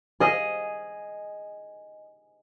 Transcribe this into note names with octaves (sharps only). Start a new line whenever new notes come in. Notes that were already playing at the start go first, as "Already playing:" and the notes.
G#4 D#5